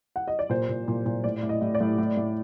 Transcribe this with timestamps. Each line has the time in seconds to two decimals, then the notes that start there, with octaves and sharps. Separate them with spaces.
0.16 F#5
0.28 D#5
0.39 D5
0.50 A#2 C5
0.69 A#2
0.88 A#2
1.06 A#2
1.24 A2 D5
1.43 A2
1.49 D#5
1.61 A2
1.75 D5
1.80 A2
1.98 A2
2.17 A2